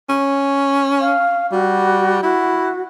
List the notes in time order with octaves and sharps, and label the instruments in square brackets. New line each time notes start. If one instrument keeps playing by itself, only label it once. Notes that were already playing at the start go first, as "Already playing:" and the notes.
[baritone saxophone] C#4
[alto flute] F5
[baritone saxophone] G3 [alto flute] F#4
[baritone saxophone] E4 [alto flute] F#4